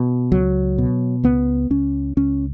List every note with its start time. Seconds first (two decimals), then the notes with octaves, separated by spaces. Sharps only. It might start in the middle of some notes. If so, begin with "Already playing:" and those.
Already playing: B2
0.32 C#2 F#3
0.78 B2
1.23 C#2 B3
1.70 C#2 C#4
2.17 C#2 C#4